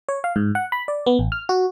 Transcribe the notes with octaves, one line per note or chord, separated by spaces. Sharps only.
C#5
F5
G#2
F#5
B5
D5
B3
A1
F6
F#4